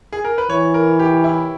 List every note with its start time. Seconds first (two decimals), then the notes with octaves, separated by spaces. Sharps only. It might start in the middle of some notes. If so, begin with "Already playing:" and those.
0.13 G#4
0.25 A#4
0.38 B4
0.50 E3 C#5
0.74 A#4
0.99 G4
1.24 E4